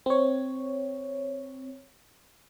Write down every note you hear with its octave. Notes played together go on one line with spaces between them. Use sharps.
C4 C#5